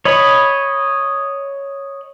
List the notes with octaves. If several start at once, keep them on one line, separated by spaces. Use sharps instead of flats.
C#5 D#5 B5